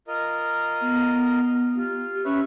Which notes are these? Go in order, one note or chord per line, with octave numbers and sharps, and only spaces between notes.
F4 A#4 D#5
B3
F4 G4
C#4 B4 C#5 E5